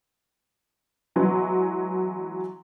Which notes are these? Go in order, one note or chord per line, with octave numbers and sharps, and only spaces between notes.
E3 F#3 G#3 B3